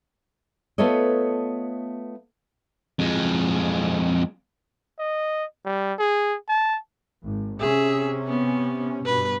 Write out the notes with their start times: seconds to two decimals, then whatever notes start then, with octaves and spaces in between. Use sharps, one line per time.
0.78 A3 B3 F4 A4 C#5 D#5
2.99 F2 G#3
4.98 D#5
5.65 G3
5.99 G#4
6.49 A5
7.23 G#1
7.60 C3 C#4 G#4 E5
8.28 B3
9.05 G2 B2 B4